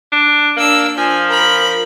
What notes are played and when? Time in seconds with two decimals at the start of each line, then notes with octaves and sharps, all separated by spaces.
0.12 D4
0.57 A#3 D4 E6
0.98 F3 G#5
1.29 A#4 B5